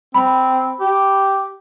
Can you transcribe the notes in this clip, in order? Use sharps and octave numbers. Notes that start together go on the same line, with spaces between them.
C4 B5
G4